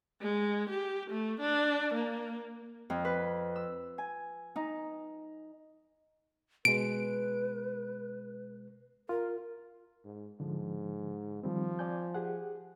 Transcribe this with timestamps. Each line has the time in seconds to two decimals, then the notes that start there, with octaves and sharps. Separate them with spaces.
0.21 G#3
0.70 G4
1.11 A3
1.40 D4
1.94 A#3
2.90 F2
3.05 B4
3.56 E6
3.98 G#5
4.56 D#4
6.65 B2 G#3 B4 D7
9.09 F4 A#4
10.04 G#2
10.40 G#2 D3 F3
11.43 D#3 F3 G3 C4
11.79 D5 G#5 G6
12.15 G4 G#4 F#5